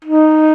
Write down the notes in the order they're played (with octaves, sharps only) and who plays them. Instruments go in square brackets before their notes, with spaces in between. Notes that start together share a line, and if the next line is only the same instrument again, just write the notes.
[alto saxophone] D#4